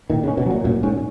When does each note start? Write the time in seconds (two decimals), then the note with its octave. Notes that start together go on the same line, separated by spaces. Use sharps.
0.10 A#2 D#3
0.23 C#3
0.28 C#4
0.37 B2
0.46 A#2 F#3
0.64 F#2 A#2
0.83 G#2 C#4